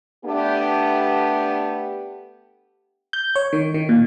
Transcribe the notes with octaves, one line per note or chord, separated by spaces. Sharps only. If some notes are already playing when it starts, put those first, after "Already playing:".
A3 B3 D4 G4
G6
C#5
D#3
D#3
A#2